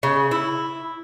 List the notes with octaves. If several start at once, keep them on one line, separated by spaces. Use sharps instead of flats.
C#3
E4